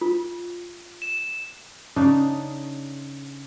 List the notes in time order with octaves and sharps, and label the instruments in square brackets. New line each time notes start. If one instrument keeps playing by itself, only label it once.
[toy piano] F4
[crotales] E7
[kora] C#3 D4 D#4